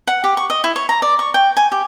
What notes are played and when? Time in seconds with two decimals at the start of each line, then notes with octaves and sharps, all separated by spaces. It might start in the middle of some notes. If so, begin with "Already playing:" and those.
0.07 F#5
0.24 G4
0.37 C#6
0.50 D#5
0.64 E4
0.76 C#5
0.89 A#5
1.02 D5
1.19 C#6
1.34 G5
1.57 G#5
1.72 G4